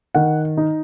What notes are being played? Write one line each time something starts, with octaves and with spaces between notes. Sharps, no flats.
D#3 F#5
D#4